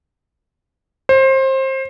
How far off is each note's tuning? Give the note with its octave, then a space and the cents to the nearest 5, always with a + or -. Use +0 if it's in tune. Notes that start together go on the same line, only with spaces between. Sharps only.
C5 +25